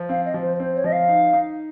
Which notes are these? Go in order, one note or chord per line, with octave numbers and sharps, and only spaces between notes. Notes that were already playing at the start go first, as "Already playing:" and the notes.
Already playing: F3
C4 F5
D#5
F3
C5
C4 C5
C#5
F3 D#5
F5
D#4
D#4